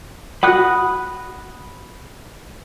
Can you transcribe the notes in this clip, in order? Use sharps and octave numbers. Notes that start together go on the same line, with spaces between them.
F#4 F#5 B5 D#6 F#6